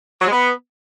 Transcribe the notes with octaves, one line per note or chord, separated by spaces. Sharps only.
F#3
G#3
B3